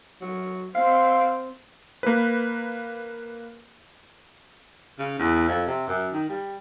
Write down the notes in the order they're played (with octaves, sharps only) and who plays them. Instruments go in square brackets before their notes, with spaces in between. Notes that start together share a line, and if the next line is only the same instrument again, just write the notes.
[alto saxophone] F#3
[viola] C4 [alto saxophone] F5
[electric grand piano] A#3 B4
[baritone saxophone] C#3
E2
F2
C3
F#2
D#3
G3